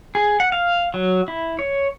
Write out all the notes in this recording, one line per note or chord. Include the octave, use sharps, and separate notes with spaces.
G#4
F#5
F5
F#3
E4
C#5